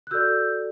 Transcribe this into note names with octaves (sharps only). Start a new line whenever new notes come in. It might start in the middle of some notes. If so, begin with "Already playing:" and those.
F#6
F#4 A4 D5 E6 G6